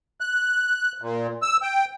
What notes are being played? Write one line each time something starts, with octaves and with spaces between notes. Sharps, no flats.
F#6
A#2
E6
G5